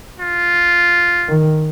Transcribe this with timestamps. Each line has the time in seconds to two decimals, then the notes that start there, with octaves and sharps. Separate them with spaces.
0.20 F4
1.29 D#3